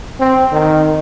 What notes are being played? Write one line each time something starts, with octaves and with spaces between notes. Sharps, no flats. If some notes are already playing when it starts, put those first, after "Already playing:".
C4
D#3